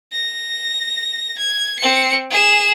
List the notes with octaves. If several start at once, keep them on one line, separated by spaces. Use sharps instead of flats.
A#6
G#6
C4 C#7
G#4 E7